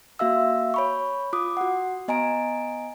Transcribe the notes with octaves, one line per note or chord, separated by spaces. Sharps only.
A#3 F#4 E5 F5 E6
C#5 B5 C#6
F4 D6 D#6
F#4 F#5
B3 D#5 G#5 A#5 D7